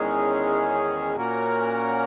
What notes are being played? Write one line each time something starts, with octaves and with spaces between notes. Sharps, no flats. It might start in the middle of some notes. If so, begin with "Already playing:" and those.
Already playing: E2 D#3 G#3 C#4 G#4
A#2 A#3 C#4 F#4 A#4